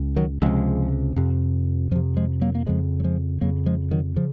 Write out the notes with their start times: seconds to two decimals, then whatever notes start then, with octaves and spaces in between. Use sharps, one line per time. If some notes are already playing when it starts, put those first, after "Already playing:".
Already playing: C#2
0.16 D#3 F#3
0.42 C#2 C3 F3 G#3
1.16 F2 C3
1.91 F2 F3
1.95 C3
2.17 F3 G#3
2.41 F#3 A#3
2.55 A#3
2.66 F2 C#3 F3 G#3
3.00 F#3
3.04 F3 G#3
3.41 F2 C#3 F#3 A#3
3.66 F3 G#3
3.91 D#3 F#3
4.16 C#3 F3